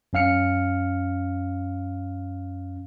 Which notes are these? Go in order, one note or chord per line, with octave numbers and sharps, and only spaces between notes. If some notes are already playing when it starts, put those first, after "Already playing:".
F#2 C#4 F5 F6 C#7